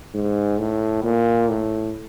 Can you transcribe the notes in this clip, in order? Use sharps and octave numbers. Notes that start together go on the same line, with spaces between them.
G#2
A2
A#2
A2